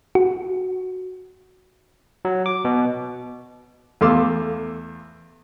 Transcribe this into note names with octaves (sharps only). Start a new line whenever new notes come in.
F#4
F#3
D6
B2
E2 A3 F5 C6 D6 E6